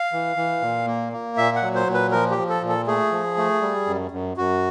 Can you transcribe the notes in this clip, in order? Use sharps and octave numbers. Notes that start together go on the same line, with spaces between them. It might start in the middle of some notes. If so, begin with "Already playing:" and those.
Already playing: F5
E3
E3
A#2
A#3
A#3
A#2 E5
F#5
F#3
C5
A#2
B4
F3 A#4
G4
F3
A4
A#2
A4
A3 G#4
F3
A3
G3
F#2
F#2
F#2 F#4